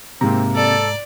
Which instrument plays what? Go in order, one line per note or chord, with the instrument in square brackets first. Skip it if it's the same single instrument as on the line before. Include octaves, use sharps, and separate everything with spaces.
[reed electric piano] G#2 A#5 [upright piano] C3 A#3 [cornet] C4
[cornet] A4 [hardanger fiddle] D5